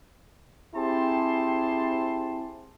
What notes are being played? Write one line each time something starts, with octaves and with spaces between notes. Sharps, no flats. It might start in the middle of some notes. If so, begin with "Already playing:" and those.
C4 E4 G4 G#4 A5 C6